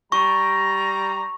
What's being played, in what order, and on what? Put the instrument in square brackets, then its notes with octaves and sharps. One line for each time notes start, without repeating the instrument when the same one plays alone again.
[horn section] G3 A#5 [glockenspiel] C#6